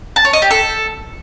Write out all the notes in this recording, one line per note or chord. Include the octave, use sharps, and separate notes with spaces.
A5
C#5
D#5
G4
A4